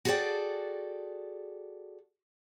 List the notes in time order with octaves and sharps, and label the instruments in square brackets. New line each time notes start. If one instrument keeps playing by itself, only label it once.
[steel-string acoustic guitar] F#4 G#4 A4 B4 D5 G5